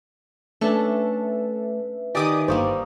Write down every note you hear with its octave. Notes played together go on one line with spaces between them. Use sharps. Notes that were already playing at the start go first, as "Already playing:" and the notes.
A3 C#4 D4 A4 B4 E5
D#3 G4 D5 G#5 D6 D#6
G1 G3 A#3 C5 D5 C#6 D#6